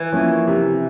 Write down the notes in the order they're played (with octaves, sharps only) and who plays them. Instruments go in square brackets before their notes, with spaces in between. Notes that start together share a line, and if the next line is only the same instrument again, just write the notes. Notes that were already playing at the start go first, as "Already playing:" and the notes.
Already playing: [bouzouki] E3
[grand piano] F3 A#3 C#4
C3